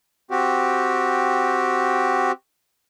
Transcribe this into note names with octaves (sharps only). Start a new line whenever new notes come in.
C4 F#4 G4